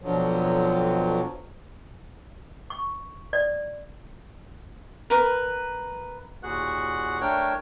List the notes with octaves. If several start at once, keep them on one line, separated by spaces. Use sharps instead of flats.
F2 B2 D3 F3 F#3
C#6
D5
A#4 B4
D#2 A#2 F#4 G#4 F#5 F#6
A3 D4 A#4 C#5 G5